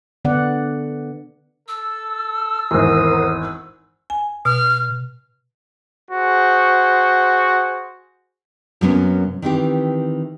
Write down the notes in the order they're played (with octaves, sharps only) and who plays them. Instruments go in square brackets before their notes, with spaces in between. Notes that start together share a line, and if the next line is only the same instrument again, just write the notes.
[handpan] D3 B3 D5 F#5
[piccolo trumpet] A4 [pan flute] E6
[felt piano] G#1 E2 [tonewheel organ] A#4 C5 [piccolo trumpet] D#6
[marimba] G#5
[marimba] B2 [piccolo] F6
[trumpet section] F#4 G#4 C5
[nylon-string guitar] F#2 C3 F#3 A#3 B3 C#4
D#3 E3 C4 G4